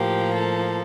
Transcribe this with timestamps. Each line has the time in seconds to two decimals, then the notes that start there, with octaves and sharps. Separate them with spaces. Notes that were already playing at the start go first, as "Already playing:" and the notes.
Already playing: A2 F3 A#3 G4
0.34 A4